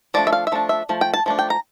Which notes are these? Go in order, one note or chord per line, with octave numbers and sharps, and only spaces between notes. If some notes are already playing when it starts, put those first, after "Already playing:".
F3 A3 D4 D5
E5
F5
E5
F3 A3 D4
E5
F3 A3
G5
A5
F3 A3 D4
G5
A#5